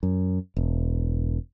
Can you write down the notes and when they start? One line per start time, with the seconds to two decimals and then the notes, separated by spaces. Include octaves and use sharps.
0.03 F#2
0.57 E1